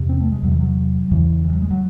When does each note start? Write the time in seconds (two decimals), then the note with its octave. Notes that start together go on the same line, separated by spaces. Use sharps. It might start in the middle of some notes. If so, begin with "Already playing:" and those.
Already playing: E2 C3
0.09 C4
0.21 A3
0.32 G#3
0.43 E2 F#3
0.47 C3 E3
0.60 F#3
1.11 E2 C#3 E3
1.44 E3
1.53 F#3
1.62 G#3
1.71 F#3